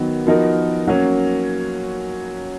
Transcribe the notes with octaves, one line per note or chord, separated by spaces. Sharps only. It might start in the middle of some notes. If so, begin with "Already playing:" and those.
Already playing: D#3 F#3 B3
F3 B3 D#4 F#4 A#4
F#3 A#3 C#4